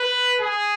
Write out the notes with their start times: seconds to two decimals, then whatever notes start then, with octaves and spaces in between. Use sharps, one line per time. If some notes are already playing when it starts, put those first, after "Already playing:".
Already playing: B4
0.40 G#4